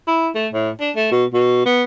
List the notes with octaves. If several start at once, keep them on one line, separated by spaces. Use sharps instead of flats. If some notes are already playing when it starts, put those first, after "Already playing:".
E4
A3
A2
D4
A3
B2
B2
B3